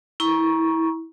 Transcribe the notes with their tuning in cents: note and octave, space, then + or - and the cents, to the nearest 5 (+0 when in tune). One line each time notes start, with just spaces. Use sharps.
E4 -20 A#5 +25 C#6 +0